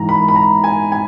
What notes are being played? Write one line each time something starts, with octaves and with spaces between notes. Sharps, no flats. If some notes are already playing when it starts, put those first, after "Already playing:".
Already playing: G#2 E3 A#5
B5
B5
A#5
G#5
G#5